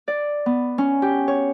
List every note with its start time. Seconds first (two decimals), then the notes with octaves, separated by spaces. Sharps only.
0.08 D5
0.46 B3
0.78 C#4
1.02 G4
1.28 C#5